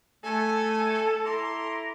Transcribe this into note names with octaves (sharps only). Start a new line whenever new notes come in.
A3 A4 G#5
E4 A#5 C6 D6